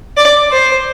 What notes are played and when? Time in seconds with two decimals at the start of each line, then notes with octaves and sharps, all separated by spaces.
0.17 D5
0.52 C5